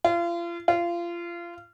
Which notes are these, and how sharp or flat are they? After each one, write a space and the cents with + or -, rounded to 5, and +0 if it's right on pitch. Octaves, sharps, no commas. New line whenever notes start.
F4 -35
F4 -25